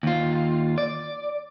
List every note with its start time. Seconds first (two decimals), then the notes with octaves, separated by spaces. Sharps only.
0.03 D#2 F4
0.78 D5